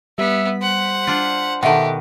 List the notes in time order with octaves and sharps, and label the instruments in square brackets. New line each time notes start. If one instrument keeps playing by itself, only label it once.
[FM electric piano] G3 B6 [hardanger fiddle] B3 [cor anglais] E5
[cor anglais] C5 [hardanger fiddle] F#5
[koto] D4 F4
[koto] B2 D#3 [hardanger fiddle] G4 [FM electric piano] A4 E5 F#5